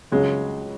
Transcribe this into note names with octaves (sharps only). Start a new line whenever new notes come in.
C#2 C#3 F#3 G#3